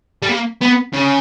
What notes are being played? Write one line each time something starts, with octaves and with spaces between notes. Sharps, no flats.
G3
A#3
B3
C#3